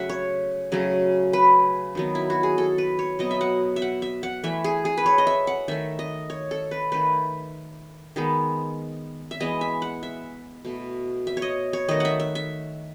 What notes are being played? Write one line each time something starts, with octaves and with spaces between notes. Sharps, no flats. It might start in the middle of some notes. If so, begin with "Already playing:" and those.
Already playing: C#3 F#3 A3 E5 F#5
C#5
C#3 F#3 A3
B4
D#3 F#3 B3
E4
F#4
G#4
A4
B4
C#5
B2 F#3 B3 D#5
E5
F#5
E5
F#5
E5
F#5
E3 A3 E5
G#4
G#4
B4
C#5
D#5
E5
F#5
D#3 A3 E5
D#5
C#5
A4
B4
D#3 A3 B4
D#3 G#3 B3
E5
E3 G#3 B3 D#5
E5
F#5
E5
B2 A3
E5
C#5
D#5
C#5
D#3 A3 D#5
E5 F#5
E5
E5